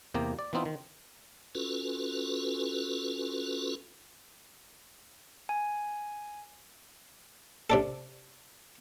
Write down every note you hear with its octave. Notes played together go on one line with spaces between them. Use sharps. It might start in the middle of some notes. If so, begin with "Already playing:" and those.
E2 C3 A#3 G4 A#5
D5
E3 B3 C4 D#4 F4
D#3
C#4 F4 F#4 A4 B4
G#5
C3 D4 A4